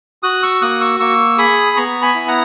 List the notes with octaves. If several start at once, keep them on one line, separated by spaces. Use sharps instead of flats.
F#4 D#6 F#6
C#6 E6
A#3 D#6 F#6
C#6 E6
A#3 C#6 E6
G#4 B5 D#6
B3 A#5 C#6
G#5 B5
E4
F#5 A#5